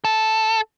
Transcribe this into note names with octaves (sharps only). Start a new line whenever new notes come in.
A4